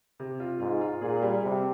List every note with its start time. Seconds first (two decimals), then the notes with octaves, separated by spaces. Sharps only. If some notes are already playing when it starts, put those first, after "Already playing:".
0.20 C3
0.40 F4
0.60 G#2 F4
0.81 F4
1.01 A#2 G#4
1.22 G3
1.42 C3 G3